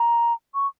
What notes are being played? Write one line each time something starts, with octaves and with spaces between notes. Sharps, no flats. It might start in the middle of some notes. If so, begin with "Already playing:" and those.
Already playing: A#5
C#6